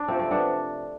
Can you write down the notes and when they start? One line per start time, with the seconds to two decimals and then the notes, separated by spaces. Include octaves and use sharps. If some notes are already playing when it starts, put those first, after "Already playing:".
Already playing: D4
0.08 C3 F3 A3 C4
0.19 C4
0.31 B3 D4